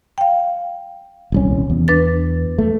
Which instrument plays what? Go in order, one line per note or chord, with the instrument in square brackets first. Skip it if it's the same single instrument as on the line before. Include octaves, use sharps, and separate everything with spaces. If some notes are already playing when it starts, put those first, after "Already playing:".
[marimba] F5 G5
[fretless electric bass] D#1 C2 C#4
E2
[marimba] D4 B4 A6
[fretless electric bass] A3